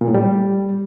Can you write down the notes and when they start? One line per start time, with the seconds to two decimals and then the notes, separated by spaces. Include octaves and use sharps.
0.01 A#2
0.08 A2
0.14 G3